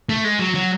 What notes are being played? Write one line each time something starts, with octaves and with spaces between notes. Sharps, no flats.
A3
G#3
F#3
F#3